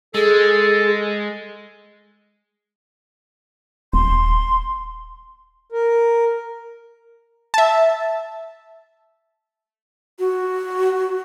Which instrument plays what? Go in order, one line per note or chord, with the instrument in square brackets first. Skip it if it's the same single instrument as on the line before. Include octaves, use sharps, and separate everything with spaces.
[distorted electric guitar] G#3 [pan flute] G#4 [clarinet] A4
[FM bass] D#1 [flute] C6
[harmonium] A#4
[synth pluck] E5 A5
[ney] F#4